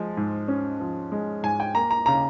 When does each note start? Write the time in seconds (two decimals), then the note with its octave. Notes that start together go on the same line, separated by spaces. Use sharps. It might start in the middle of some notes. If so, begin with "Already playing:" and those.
Already playing: F3 G#3
0.17 G#2
0.48 C#4
0.80 F3
1.12 G#3
1.43 G#2 G#5
1.60 G5
1.75 A#3 A#5
1.91 A#5
2.06 C#3 A#5